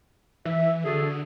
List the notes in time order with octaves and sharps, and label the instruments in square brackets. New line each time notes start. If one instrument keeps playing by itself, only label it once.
[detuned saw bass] E3 [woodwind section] E5
[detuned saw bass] D3 [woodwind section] F#4 G#4 A4